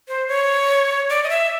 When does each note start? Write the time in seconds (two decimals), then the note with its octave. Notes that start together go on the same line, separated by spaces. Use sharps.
0.08 C5
0.28 C#5
1.10 D5
1.23 D#5
1.29 E5